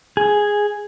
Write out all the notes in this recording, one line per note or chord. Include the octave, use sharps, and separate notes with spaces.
G#4